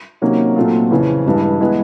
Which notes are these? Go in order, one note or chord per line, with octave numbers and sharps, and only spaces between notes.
C3 D#3 F#3 A#3 C#4
A#2 F#3 A3 C4 F4
F2 C#3 E3
G2 E3 G#3
E3 G#3 B3